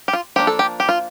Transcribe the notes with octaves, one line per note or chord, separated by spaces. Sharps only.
G4
F4
F3 A#3 D4 G4
A4
G4
G4
F4